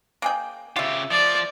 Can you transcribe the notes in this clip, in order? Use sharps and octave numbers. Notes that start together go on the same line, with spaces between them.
A#3 G#4 G5
C#3 F4 G4 E5
F3 D5